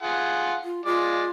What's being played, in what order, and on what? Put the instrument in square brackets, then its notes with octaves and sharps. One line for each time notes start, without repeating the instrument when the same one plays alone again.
[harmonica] F4 G#4 F#5
[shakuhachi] F4
[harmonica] G#3 D5 [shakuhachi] F4